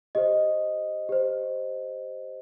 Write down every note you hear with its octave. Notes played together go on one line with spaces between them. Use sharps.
G4 C5 D#5
G4 C5